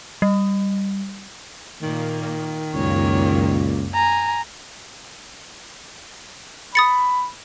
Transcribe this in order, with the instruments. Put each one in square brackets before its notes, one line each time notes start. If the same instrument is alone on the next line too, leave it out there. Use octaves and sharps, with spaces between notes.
[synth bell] G3
[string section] A#2 A#3 [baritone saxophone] D#3
[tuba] C#2 [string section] F#2 A#2 A#3 [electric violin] C#5
[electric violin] G#5 A#5
[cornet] B5 [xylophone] D#6 A6 C#7